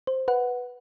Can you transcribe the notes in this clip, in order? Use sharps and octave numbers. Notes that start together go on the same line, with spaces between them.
C5
B4 F#5